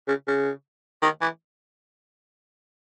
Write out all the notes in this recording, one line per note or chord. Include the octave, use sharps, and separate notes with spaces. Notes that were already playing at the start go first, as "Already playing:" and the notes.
C#3
C#3
D#3
E3